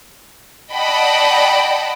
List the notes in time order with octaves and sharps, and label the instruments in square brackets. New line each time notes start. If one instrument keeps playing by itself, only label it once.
[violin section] D5 D#5 F#5 G5 A5 B5